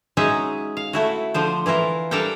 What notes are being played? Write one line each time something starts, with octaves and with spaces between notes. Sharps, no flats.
F#3 G#3 C#4 D#4 G#4 E5
F5
A3 E4 F#4
D3 F3 C5
E3 E4 F4 A#4
G3 D4 A4 A#4 F5 G5